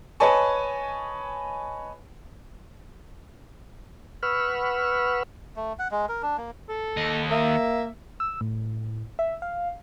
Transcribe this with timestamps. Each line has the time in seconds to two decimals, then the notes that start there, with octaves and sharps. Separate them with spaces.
0.20 B4 C#5 D#5 G#5 A5 C#6
4.23 B4 F#5 B5 C#6 E6 F6
5.56 A3
5.79 F#5
5.91 G#3
6.09 A#4
6.22 D4
6.38 A#3
6.69 A4
6.97 D#2 D#5
7.31 A#3 E5
8.20 E6
8.41 A2
9.19 E5
9.42 F5